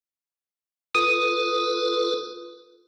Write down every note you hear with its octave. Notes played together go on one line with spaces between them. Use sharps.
F4 A4 B4 D#6